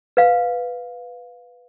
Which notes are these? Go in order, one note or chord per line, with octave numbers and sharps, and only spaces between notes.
B4 F5